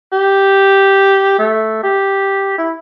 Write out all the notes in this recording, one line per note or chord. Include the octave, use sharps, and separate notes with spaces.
G4
A3
G4
E4